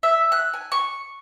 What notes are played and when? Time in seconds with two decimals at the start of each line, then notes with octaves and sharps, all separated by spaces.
0.03 E5
0.32 F#6
0.54 G#5
0.72 C#6